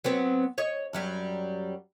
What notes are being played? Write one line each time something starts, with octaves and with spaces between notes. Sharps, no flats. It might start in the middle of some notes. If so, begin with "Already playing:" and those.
F#3 B3 C4
C#5 D#5
F#2 F#3 G3